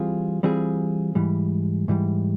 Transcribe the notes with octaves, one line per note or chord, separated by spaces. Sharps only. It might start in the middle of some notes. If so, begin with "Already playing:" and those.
Already playing: E3 G3 C4 F4 G#4
E3 G3 C4 F4 G#4
G#2 E3 G3
G#2 E3 G3